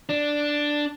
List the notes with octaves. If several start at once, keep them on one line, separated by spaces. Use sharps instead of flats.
D4